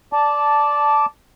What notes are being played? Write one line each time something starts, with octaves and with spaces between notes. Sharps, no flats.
D5 A5